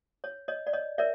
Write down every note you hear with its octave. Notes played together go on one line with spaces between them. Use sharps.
C#5
C#5 D#5
D5
C#5 D#5
A#4 C#5 D5 E5